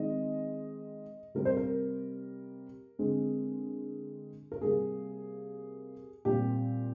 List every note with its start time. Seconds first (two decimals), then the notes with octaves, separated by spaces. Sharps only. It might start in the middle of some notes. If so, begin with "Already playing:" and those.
Already playing: D#3 G#3 C4 D#5
1.35 C3 G3 C4 A#4
1.45 C5
1.57 A#4
2.99 D3 G#3 C4
4.52 A#4
4.61 C3 G3 A#3 G#4
6.25 A#2 G3 C4 G4